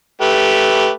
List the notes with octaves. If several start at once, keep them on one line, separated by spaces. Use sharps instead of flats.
A3 G4 B4